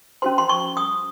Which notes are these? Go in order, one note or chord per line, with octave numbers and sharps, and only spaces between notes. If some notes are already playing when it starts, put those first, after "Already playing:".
C#4 F#4 C5 C6
C6
C#6
D#6